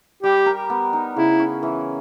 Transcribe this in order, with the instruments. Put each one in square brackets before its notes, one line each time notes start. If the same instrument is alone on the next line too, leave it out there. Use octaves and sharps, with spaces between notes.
[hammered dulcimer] G3 [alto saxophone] G4
[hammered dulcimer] A#4
B3
D#4
[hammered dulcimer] C#3 [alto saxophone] E4
[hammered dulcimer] C#4
E3